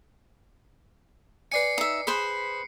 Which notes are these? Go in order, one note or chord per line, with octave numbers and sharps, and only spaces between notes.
B4 D5 G#5 C7 C#7
D#4 E5
G#4 B4 C5 B5